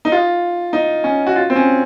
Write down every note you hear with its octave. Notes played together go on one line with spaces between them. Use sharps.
D#4
F4
D#4
C#4
F#4
F4
C4
C#4